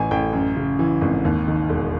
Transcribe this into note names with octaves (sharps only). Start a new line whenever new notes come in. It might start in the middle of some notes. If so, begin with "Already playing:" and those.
Already playing: A1 A2 E3 G#5
A1 G5
F#2
C#3
E3
G#1
D#2
D#3
E1